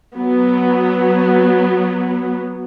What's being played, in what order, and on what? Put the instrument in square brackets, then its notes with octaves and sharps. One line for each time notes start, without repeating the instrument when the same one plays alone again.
[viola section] F#3 B3